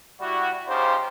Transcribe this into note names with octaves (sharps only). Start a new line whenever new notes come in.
G3 E4 F#4
C#3 F3 D#4 G4 C5